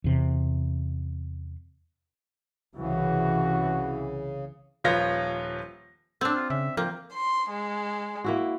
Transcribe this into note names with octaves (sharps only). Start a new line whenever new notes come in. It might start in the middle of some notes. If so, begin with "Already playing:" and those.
E2 C3
C2 C#3 E3 F#4
D#1 F3 F4 B4 C#5 A#6
C4 D4 E6
F4
C#3 E5
F3 A#3 G5
C6
G#3
A#3 E4 F#4